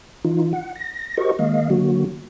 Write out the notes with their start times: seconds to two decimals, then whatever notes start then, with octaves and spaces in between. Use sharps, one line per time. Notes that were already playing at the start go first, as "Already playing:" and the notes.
0.25 E3 D#4 F4
0.53 F#5
0.75 A#6
1.17 F#4 G4 A#4 C5 D#5 C#6
1.39 D#3 G#3 A#3 D#5 F5
1.70 D3 F#3 A#3 F#4